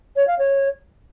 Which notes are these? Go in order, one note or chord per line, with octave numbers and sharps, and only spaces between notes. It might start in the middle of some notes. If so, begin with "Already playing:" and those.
C#5
F5
C#5